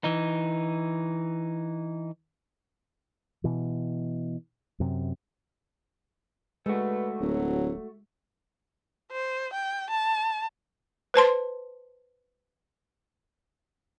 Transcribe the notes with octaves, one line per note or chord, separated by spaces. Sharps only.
E3 D#4
B2 E3
F#2 C3
G#3 A3 F#4 B4
D1 F#3
C5
G5
A5
B4 C5 A5 C6